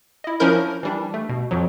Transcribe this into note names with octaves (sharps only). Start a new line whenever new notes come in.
E4 D#5
F3 C#4 D4 E4 A#4 G6
E3 G3 D4
A3
B2
F2 F3 F#3